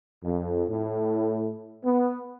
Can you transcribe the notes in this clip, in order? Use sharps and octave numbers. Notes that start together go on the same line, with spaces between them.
F2
A2
B3